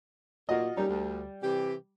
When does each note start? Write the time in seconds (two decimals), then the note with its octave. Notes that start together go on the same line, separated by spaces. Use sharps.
0.49 A#2 F4 F#4 D#5
0.77 G3 A#3 C#4 D#4
0.89 D2
1.42 C3 E3 G4